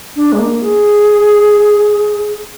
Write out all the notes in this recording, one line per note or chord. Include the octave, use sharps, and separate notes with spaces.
D4
G#3
A#3
G#4